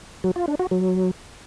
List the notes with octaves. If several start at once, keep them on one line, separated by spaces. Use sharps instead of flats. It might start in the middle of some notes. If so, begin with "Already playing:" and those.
F#3
F4
D4
F#4
F#3